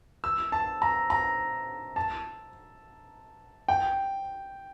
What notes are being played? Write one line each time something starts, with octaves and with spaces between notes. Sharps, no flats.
E6
A5
A#5
A#5
A5
G5